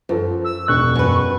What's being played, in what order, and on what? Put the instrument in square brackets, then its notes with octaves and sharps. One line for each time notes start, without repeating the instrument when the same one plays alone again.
[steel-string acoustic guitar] F#2 [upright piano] F3 A4
[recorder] E6
[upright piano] E1 F#6 [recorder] C#6
[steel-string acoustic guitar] F#2 B4